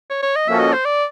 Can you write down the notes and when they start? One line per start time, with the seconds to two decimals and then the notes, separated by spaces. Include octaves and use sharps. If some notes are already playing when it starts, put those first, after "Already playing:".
0.10 C#5
0.23 C#5
0.36 D#5
0.47 F3 A#3 C#4 F#4 A4 E5
0.59 D#5
0.73 C5
0.85 D5